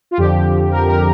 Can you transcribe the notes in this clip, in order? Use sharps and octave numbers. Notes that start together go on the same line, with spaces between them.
F4
F2 D3 F3 G4
A#4
A#4